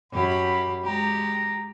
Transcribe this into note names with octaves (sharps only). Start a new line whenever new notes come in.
F#2 G4 B5
G#3 G4 A#5